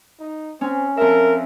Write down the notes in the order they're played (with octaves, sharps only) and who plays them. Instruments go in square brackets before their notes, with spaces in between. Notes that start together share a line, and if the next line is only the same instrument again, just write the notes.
[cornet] D#4
[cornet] C4 [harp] C#4
[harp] F2 E5 [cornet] A#4